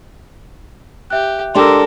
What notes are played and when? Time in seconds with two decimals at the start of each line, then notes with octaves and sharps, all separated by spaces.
1.10 G4 E5 F#6
1.55 G#3 D4 G4 A4 A#4 C6 D6 E6